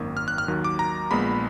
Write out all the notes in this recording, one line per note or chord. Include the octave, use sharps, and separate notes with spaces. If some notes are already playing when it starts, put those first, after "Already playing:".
Already playing: G#1 F#2 D#3 A#3
F6
F#6
F6
D#2 D#3 F#3
D6
A#5
A#1 A#2 G#3 B3 B5